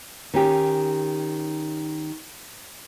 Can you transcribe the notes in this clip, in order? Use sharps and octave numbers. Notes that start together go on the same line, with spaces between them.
D#3 C#4 G4